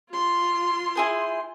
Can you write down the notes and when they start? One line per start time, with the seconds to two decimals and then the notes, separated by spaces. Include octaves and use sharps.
0.10 F4 C6
0.95 E4 G#4 C5